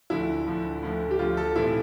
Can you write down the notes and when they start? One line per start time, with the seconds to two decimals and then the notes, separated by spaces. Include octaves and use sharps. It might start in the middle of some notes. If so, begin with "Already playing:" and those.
0.10 D2 D3 F3 E4
0.47 D2 D3 F3
0.83 D2 D3 F3
1.11 G4
1.19 D2 D3 F3 F4
1.37 A4
1.56 B1 A2 E3 A3 C4 E4